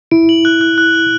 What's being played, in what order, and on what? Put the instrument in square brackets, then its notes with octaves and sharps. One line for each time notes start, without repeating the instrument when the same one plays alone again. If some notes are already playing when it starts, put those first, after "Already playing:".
[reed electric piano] E4 [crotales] D7
[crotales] F#7
F#6
F#6
F#6
F#6